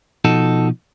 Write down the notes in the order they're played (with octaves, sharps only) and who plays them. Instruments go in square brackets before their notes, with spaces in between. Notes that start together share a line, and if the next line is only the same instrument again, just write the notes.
[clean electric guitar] B2 F3 D#4 F#4 A4